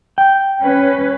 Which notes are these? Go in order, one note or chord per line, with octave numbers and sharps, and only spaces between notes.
G5
C#4 B4